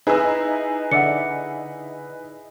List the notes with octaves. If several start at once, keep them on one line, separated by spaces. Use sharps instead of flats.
D#4 E4 G#4 B4 E6
D3 D5 E5 F#5 C#7